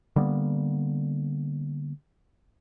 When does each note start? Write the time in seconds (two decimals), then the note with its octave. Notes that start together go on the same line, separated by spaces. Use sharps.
0.16 D3 G3 A#3 B3